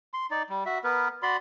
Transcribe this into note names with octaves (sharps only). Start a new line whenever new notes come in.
C6
D#4 D5
G3
F#4 E5
B3 A#4 B4
F#4 D5 B5 C6